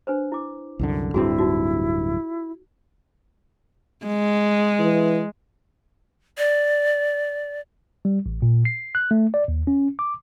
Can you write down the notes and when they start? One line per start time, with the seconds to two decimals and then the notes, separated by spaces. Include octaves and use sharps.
0.07 D4 B4 C5
0.32 E4 D6
0.79 C2 F#2 D3
1.14 D1 G2 C4 E4 F#4 G#4
1.39 D#4 F4 F#4
4.06 G#3
4.79 E3
6.38 D5
8.05 G3
8.26 A1
8.42 A#2
8.65 C7
8.95 F#6
9.11 A3
9.34 D5
9.48 D#2
9.67 C#4
9.99 D6